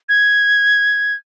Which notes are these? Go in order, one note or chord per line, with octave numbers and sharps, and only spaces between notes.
G#6